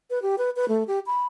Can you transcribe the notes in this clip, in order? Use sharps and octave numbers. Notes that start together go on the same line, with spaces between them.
B4
G4
B4
B4
A3
G4
B5